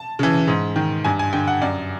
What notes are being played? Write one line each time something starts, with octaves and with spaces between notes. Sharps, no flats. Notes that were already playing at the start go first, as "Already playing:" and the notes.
Already playing: A5
C#3 E3
G#2
D#3
G2 G#5
G#5
D3 G5
F#5
F#2 D5